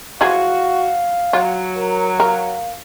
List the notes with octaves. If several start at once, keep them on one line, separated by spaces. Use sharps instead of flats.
E3 F3 F#4 G#4 F5
F#3 F4
A#4
A#4 F5